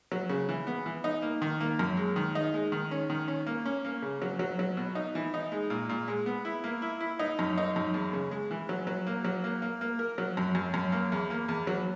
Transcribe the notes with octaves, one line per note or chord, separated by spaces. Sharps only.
F#3
C#3
E3
B3
E3
D#4
A#3
D#3
A#3
F#2
G#3
D#3
D#4
G#3
D#3
C#4
D#3
C#4
A#3
C#4
A#3
C#3
F#3
F#3
F#3
B2
D#4
E3
D#4
G#3
A#2
A#2
G#3
B3
E4
A#3
E4
E4
D#4
F#2
D#4
F#2
E2
C#3
G#3
E3
F#3
F#3
A#3
F#3
A#3
A#3
A#3
A#4
F#3
F#2
F#2
F#2
A#3
E2
A#3
E2
F#3